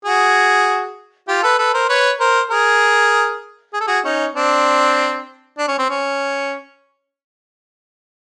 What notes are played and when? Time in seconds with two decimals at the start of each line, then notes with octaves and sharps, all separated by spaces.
0.05 F#4 G#4
1.28 F4 G4
1.43 A4 B4
1.58 A4 B4
1.74 A#4 C5
1.89 B4 C#5
2.20 A#4 C5
2.50 G#4 A#4
3.73 G#4
3.81 A4
3.87 F#4 G#4
4.04 C#4 D#4
4.35 C4 D4
5.58 D4
5.68 C#4
5.79 C4
5.90 C#4